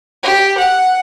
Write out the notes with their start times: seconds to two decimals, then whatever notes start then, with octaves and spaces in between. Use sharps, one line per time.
0.23 G4
0.58 F#5